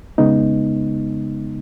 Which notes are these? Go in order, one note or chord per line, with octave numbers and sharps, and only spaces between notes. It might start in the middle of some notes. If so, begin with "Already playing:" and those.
C#3 G#3 B3 D#4